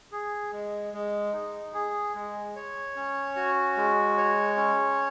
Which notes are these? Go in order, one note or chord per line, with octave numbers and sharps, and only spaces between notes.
G#4
G#3
G#3
D#4
G#4
G#3
C#5
C#4
F#4
G#3
C#5
C#4